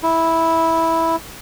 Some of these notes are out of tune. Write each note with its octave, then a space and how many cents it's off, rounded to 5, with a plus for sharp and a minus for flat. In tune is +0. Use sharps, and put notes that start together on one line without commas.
E4 -10